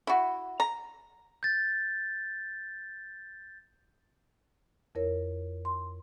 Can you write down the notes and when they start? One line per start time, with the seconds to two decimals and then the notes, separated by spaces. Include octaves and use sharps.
0.07 E4 F#4
0.60 A#5
1.43 G6 A6
4.95 F2 E4 A#4 C#5
5.65 C6